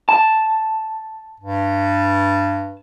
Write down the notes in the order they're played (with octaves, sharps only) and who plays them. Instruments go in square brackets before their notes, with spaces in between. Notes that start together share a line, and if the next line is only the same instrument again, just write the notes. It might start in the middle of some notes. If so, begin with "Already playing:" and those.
[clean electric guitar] A5
[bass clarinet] G2